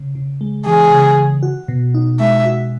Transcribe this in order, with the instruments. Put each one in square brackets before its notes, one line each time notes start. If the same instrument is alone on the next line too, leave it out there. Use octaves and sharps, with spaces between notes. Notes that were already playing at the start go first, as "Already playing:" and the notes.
Already playing: [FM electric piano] C#3
C#3
G#3
[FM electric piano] E3 [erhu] G#4
[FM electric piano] C#3
C#3
F#4
B2
D#4
[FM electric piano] G#3 [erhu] E5
[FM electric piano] F#4